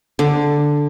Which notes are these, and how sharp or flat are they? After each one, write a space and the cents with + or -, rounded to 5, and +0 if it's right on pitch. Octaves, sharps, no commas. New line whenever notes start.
D3 +0 D6 +20